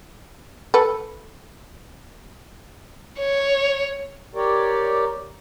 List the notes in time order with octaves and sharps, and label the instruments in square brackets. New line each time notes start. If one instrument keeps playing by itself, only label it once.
[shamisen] A4 B4
[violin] C#5
[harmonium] G4 A#4 C#5 D5